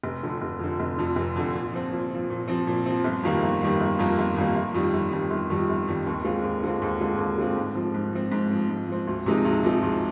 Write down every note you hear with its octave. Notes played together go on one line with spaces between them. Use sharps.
F1
F2 D3
F1
F2 D3
F1
F2 D3
F1
F2 D3
A#2
F3 C4
A#2
F3 C4
A#2
F3 C4
A#2
F3 C4
G1
F2 D#3 G3 A#3
G1
F2 D#3 G3 A#3
G1
F2 D#3 G3 A#3
G1
F2 D#3 G3 A#3
G1
F2 D#3 G3
G1
F2 D#3 G3
G1
F2 D#3 G3
G1
F2 D#3 G3
D#2
D3 G#3 C4 F4
D#2
D3 G#3 C4 F4
D#2
D3 G#3 C4 F4
D#2
D3 G#3 C4 F4
G#2
F3 C4
G#2
F3 C4
G#2
F3 C4
G#2
F3 C4
D2
C3 F3 G#3 D#4
D2
C3 F3 G#3 D#4
D2